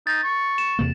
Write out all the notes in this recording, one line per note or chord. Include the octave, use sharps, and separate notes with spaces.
D#4 A6
C#6
E7
E2 C3 A#3